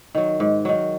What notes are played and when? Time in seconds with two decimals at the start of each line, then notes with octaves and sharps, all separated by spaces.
0.15 D#3 F#3
0.40 G#2
0.65 D#3 F#3